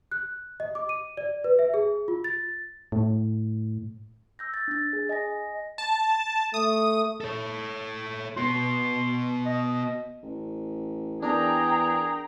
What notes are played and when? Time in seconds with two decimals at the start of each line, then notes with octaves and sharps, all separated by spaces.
0.11 F#6
0.60 D#5
0.75 D6
0.89 D#7
1.17 D5
1.44 B4
1.59 E5
1.74 G#4
2.08 F4
2.24 A6
2.92 A2
4.39 E6 G6 A#6
4.54 A6
4.68 D4 A6
4.93 G#4
5.09 D#5 G#5 A#6
5.78 A5
6.54 A3 D#6
7.21 A4 C#5
8.37 B3 F#4 C6
9.46 D#5
10.23 A1
11.22 E2 D4 G#4 A#4 G5 A#5